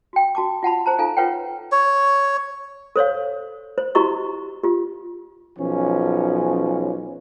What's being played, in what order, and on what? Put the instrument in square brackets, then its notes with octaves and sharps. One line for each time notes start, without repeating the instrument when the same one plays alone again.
[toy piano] F#4 G5
F#4 A5 D6
F4 F#5 A5 B5
G#4 C5 A5 A#5
D#4 F4 A4 F5 G#5 A#5
F4 A4 B4 C#5 F#5 G5
[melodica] C#5
[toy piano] A4 C5 C#5 F5
C5
E4 F#4 G4 D#5 A#5 C#6
F4 G4
[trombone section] B1 F3 C#4